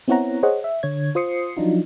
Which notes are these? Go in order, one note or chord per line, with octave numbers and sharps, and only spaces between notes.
B3 C4 E4 C#5 F#5 A#5
G#4 C5 C#5 D#5 F#5
E5
D3 C#5 G#6
F4 C5 D#6 C7 C#7
F3 F#3 D4 D#4 F4